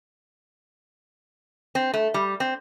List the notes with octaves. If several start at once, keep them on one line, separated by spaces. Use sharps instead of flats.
C4
A3
G3
C4